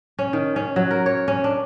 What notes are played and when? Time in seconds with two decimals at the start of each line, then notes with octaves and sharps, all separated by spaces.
0.19 C#4
0.33 D#3
0.56 C#4
0.76 F#3
0.91 A#4
1.06 C#5
1.28 C#4
1.44 D4